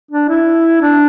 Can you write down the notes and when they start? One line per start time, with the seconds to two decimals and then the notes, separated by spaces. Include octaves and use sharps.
0.11 D4
0.29 E4
0.82 D4